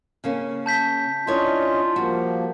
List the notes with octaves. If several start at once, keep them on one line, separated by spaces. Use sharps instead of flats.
C#3 A#3 C#4
A5 G6 B6
C#4 D4 E4 F4 C#5 D#5
F3 G3 A#3 F#4